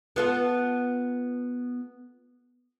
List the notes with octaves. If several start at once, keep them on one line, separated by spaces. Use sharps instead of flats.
B3 F4 A4